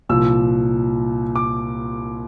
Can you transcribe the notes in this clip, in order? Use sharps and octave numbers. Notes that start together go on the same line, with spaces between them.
C2 A#2 F3 E6
D6